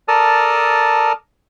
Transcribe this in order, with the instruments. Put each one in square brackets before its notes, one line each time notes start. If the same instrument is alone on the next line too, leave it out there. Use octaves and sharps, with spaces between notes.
[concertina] A4 A#4 D5 A5 D#6 F6